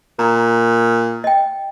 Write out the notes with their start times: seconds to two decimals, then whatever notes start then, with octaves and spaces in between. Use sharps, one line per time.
0.19 A#2 A#5
1.24 D#5 G5